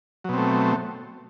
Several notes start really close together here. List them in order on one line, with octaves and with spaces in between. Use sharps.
F#3 B2 C4 A3